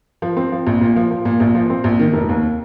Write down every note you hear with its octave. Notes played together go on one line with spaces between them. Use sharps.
F3
C4
F3
A#1
A#2
F3
F3
A#2
A#1
F3
C4
A#1
D#3
F1
D#2